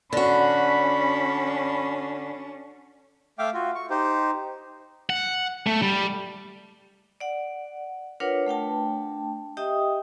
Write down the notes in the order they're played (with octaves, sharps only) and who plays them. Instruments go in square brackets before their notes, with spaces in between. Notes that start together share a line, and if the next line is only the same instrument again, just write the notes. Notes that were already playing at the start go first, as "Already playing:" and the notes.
[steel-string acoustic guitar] D3 F#4 [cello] C#4 D4 [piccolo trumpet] B5
[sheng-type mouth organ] A3 E5 F5 G5 D6
F4 F#4
C#6
D#4 G4 C5
[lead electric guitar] F#5
A3
G3
[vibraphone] D5 F#5
D4 F4 A#4 B4 C#5 F#5
A3 D4 G5 A5
G4 D#5 E5 G5 D#6